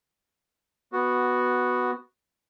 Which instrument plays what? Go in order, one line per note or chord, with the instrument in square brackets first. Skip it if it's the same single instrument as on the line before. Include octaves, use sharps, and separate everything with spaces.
[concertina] B3 F#4